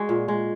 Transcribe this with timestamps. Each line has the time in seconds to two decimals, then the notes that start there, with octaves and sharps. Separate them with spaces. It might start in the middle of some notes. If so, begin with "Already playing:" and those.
Already playing: G#3 F#4 G#4
0.09 A#2
0.28 G#3